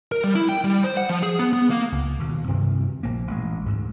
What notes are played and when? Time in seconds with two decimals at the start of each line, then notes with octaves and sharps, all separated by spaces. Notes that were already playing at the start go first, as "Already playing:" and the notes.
0.12 A#4
0.24 G3
0.35 E4
0.49 G5
0.64 G3
0.84 C5
0.97 F#5
1.10 F3
1.23 G#4
1.39 B3
1.53 B3
1.70 A#3
1.92 C#2
2.19 D#2 B2
2.47 G2 C3 D#3 C4
3.03 A#1 A#3
3.27 A1 G#3
3.66 D2 G#2